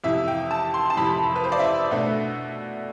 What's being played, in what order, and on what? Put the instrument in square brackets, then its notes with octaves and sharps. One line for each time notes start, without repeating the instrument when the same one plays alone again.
[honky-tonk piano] F2 C3 E3 E5
G5
A5
C6
A5
F2 C3 E3 B5
B4
C5
D5
E5
B2 A3 D4